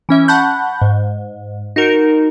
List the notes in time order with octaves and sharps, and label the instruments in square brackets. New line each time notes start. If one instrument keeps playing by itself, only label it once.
[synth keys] E3 C#4 E5
F#5 A5 B5 C#6 F#6 G6
G#2
D#4 F#4 A#4